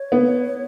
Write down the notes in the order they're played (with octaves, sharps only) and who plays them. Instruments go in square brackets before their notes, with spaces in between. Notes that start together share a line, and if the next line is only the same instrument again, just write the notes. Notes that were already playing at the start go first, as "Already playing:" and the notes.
Already playing: [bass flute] C#5
[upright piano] B3